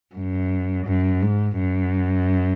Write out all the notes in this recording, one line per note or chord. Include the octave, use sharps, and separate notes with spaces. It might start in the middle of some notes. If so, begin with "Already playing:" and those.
F#2
F#2
G#2
F#2